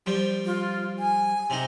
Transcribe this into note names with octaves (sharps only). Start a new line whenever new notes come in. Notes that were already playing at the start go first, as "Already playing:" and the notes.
F3 G3
F4
G#5
C3 D#4